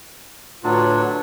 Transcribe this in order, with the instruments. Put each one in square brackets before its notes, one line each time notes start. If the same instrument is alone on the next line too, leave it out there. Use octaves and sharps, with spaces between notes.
[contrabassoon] D2 [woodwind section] A2 F4 [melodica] F#3 D4 [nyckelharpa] B4 C#5